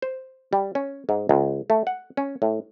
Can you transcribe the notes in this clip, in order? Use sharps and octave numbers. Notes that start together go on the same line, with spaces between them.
C5
G3
C#4
G#2
C#2
A3
F#5
C#4
A2